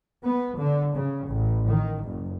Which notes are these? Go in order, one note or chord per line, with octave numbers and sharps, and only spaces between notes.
B3
D3
C#3
A1
D#3
F#1